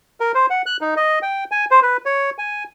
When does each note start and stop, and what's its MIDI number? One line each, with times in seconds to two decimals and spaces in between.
0.20 0.32 70
0.35 0.46 72
0.50 0.62 78
0.66 0.77 90
0.81 0.95 63
0.96 1.19 75
1.22 1.44 79
1.51 1.65 80
1.71 1.80 72
1.83 1.97 71
2.06 2.30 73
2.38 2.64 80